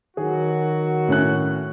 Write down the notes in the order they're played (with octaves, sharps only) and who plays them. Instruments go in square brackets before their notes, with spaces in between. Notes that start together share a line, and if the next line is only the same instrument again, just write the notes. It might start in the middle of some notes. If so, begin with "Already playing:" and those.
[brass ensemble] D#3 F#3 F#4 [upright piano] G#4
[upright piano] A2 C#4 F#6